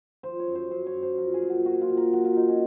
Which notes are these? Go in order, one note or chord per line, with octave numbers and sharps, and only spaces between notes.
F3 C5
C#5
F#2
C5
F#2 C5
C#5
F#2
C5
F3 A#4
G#4
A#2
F#4
A#3 F#4
F4
A#2
A#4
F#3 F#4
F4
A#3 D#4
C#4